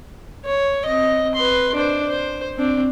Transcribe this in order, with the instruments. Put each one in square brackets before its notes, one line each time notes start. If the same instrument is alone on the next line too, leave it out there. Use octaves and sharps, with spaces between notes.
[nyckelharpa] C#5
C4 D#5
B4 C6
D4 C5
C5
C4 D4